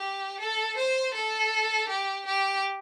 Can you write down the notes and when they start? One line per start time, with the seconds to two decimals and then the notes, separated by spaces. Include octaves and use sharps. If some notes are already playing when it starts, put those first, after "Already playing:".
Already playing: G4
0.39 A4
0.77 C5
1.14 A4
1.88 G4
2.26 G4